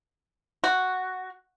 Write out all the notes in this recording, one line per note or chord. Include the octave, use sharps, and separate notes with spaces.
F#4